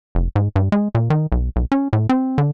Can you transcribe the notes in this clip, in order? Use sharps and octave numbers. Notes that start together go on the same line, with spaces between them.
F1
G#2
G2
G#3
A#2
D#3
B1
B1
C#4
A2
C4
D3